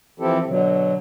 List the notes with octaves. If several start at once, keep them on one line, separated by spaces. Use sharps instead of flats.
E3 F3 C4 E4 G4 A4
B2 D3 F#3